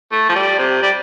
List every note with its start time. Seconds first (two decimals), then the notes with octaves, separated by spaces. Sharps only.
0.12 A3
0.29 F3
0.35 G3
0.59 C3
0.82 G3